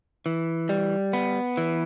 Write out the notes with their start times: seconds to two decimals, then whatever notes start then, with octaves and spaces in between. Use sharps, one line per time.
0.26 E3
0.69 G3
1.13 B3
1.57 E3